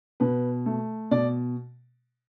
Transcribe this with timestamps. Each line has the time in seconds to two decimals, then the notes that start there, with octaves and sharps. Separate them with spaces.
0.20 B2 B4
0.66 A3
1.11 B2 D5